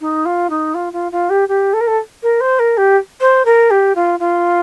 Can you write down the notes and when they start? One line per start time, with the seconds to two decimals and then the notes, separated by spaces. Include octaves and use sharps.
0.01 D#4
0.25 F4
0.50 D#4
0.74 F4
0.93 F4
1.12 F4
1.30 G4
1.48 G4
1.73 A4
1.80 A#4
1.87 A4
2.23 A#4
2.40 C5
2.59 A#4
2.77 G4
3.20 C5
3.45 A#4
3.70 G4
3.95 F4
4.19 F4